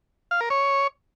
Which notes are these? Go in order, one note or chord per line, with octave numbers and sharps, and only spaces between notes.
F5
A#4
C#5